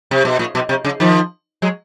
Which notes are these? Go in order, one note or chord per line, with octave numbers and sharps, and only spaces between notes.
C3
B2
A#2
B2
C3
C#3
D#3 F3
F#3 G#3